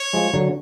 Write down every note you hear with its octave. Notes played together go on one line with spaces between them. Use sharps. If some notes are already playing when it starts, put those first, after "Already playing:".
Already playing: C#5
F3 G#3
D3 F#3